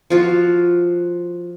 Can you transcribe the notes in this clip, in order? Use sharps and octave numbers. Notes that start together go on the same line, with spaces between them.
F3 F4 F#4